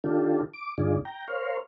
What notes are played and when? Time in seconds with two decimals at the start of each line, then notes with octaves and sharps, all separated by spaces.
0.04 D#3 D4 F4 G4 A4
0.54 D6
0.78 G2 D3 D#4 F4 G#4 D5
1.05 G5 A#5
1.28 A#4 C5 C#5 F5